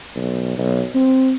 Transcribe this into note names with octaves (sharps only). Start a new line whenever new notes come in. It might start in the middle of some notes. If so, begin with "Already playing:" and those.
B1
B1
C4